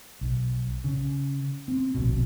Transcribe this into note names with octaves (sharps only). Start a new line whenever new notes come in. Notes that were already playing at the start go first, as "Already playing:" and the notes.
B1
C#3
C4
D1 A#1 B2